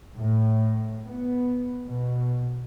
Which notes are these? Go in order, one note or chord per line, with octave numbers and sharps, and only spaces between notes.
A2
B3
B2